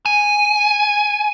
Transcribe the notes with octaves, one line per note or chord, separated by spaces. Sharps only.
G#5